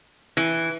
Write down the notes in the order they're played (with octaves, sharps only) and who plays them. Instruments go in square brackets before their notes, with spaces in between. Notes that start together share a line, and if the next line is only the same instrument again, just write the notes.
[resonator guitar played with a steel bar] E3